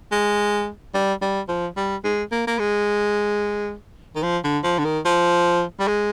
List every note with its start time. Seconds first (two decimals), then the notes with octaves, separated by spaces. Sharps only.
0.12 G#3
0.94 G3
1.22 G3
1.49 F3
1.77 G3
2.04 G#3
2.32 A#3
2.48 A#3
2.59 G#3
4.16 D#3
4.23 F3
4.44 D3
4.64 F3
4.79 D3
4.85 D#3
5.05 F3
5.80 G3
5.88 G#3